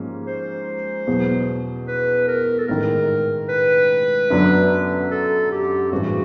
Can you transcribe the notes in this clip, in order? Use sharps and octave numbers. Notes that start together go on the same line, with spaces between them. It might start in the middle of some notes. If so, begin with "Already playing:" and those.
Already playing: G#2 F3 A#3 C#4
C5
E2 B2 F#3 B3
B4
A#4
A4
A1 G#2 D#3 A#4
B4
F#2 D3 F#3 B3 D4
A4
G4
A1 G2 E3 G#3 C4 F#4